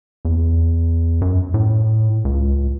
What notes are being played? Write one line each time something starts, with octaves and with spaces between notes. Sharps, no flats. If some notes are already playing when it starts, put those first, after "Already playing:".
E2
F#2
A2
C#2